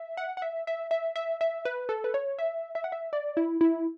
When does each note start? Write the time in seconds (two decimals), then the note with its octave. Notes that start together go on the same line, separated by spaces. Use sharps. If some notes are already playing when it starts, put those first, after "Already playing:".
Already playing: E5
0.17 F#5
0.37 F#5
0.42 E5
0.67 E5
0.91 E5
1.16 E5
1.41 E5
1.65 B4
1.89 A4
2.04 B4
2.14 C#5
2.39 E5
2.75 E5
2.84 F#5
2.92 E5
3.13 D5
3.37 E4
3.61 E4